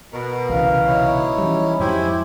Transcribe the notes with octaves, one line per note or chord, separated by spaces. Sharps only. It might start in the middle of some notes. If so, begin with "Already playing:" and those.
B2 A#4
C2 C#3 E3 F5
D#4 E4 C#5
E3 G3 C#4
F2 G#2 F#3 E4 G4 C5 G#5